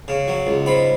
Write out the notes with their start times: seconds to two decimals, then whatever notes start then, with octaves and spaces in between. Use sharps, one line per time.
0.08 C#3
0.28 F#3
0.47 C#2
0.66 G#2 B5